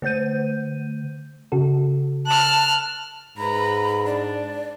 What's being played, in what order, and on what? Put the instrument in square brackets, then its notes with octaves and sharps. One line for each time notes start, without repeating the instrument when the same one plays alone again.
[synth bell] D3 A3 C5 G6 D#7
[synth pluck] C#3 F#4 A4
[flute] A5 [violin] F6 F#6
[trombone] G#2 [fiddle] B4 A#5 [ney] B5
[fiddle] D4 [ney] D5